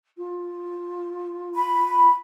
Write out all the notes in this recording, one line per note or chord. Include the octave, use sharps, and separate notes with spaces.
F4
B5